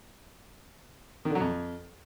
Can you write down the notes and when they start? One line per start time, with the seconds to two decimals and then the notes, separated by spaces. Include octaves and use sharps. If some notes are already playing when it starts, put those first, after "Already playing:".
1.25 D#3
1.30 D3
1.35 F#3
1.40 F2